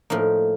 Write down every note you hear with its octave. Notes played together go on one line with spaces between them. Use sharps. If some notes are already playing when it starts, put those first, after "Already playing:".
A2 F3 A#3 D#4